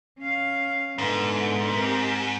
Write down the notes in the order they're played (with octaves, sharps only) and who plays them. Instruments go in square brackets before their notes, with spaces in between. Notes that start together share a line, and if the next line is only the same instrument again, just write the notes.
[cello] C#4 F5
[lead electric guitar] G#2 [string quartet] B2 D3 [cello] E3
[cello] C4 [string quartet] G4 A#4